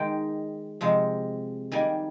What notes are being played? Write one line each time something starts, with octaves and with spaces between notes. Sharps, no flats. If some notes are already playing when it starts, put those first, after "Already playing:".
Already playing: D#3 G#3 G5
C3 F3 G#3
D#3 G3 A#3 G#5